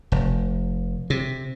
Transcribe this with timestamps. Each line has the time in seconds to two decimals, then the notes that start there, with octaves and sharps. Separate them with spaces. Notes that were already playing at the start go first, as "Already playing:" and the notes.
0.12 F1
1.10 C3